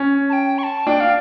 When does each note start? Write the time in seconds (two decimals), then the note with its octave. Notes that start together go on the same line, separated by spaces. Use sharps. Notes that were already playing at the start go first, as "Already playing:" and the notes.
Already playing: C#4
0.29 A5
0.33 G5
0.58 C#6
0.63 A5
0.87 D4 G5
1.00 F5